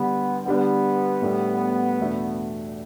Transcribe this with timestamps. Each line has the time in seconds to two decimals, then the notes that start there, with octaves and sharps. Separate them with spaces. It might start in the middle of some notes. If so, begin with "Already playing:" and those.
Already playing: D3 G3 B3 D4 G4
0.45 D3 G3 B3 D4
1.22 A2 G3 D4 A4
1.99 E2 B2 A3 D4